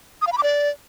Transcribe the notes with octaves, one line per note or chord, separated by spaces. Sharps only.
D#6
F5
B5
D6
D5